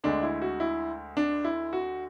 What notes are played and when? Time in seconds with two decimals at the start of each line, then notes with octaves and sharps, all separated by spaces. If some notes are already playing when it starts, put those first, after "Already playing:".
0.04 D2 D3 G#3 D4
0.23 E4
0.42 F#4
0.60 E4
1.17 D4
1.45 E4
1.73 F#4